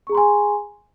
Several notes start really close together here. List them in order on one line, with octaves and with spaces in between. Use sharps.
C#6 G#4 A#5 C6 G#5